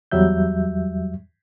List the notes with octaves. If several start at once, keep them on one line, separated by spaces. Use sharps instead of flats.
E2 F#3 G3 E5 G6